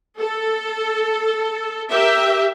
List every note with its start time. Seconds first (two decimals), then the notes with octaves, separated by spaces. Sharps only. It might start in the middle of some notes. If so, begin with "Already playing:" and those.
0.19 A4
1.90 G4 A#4 E5